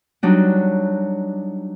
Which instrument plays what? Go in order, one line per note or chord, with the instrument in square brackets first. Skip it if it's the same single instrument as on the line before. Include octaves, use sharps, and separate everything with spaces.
[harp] F#3 G3 D4 D#4